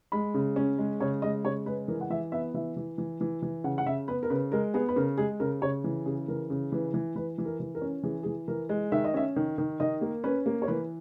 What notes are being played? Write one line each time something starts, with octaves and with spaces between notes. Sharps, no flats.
G#3 B5
C#3
C#4
G#3
C#3 C#5
G#3 D#5
C#3 C#5
G#3 B4
E3 A#4
F#5
E3 E5
B3 E5
E3 E5
E3
E3
E3
E3
C#3 F#5
F#5
C#3 E5
B3 B4
A#4
C#3 B4
G#3 A#4
B3 G#4
B4
C#3 A#4
G#3 G#4
C#3 A#4
C#3 C#5
E3
C#3 G#4
E3 A#4
C#3
E3 B4
E3
E3 B4
E3
A#4
E3
A#4
C#4
E3 G#4
G#4
E3
E3 A#4
G#3
D#3 E5
D#5
C#4 E5
D#3
D#3
D#3 D#5
A#3
C#4 B4
A#3
C#5
E3 B4